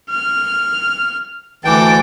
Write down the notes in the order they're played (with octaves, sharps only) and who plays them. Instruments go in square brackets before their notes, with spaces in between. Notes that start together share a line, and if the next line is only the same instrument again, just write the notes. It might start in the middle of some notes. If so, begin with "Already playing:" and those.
[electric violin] F6
[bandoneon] D2 E3 G5 [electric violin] A5 D6